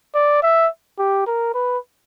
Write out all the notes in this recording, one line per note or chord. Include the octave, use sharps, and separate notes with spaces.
D5
E5
G4
A#4
B4